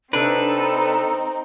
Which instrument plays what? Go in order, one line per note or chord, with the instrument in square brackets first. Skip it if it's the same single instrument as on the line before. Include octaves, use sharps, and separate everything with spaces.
[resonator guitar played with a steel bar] C3 D4 [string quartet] C4 D#4 [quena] A4 [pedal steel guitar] B4